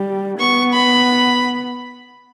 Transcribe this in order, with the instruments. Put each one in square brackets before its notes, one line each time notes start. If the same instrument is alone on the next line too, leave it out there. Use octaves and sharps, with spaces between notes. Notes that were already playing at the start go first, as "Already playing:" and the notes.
Already playing: [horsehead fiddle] G3
[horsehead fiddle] B3 [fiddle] C#6
[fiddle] B5